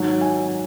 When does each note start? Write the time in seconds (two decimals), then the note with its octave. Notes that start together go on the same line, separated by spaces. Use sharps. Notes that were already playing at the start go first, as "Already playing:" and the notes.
Already playing: G#2 D#3 F#3
0.21 G#5